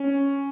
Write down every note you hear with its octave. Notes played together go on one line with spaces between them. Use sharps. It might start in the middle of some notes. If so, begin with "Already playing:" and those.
Already playing: C#4